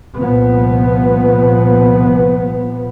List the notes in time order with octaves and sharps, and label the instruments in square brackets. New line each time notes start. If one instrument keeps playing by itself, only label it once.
[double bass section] C2 A#2 F3 B3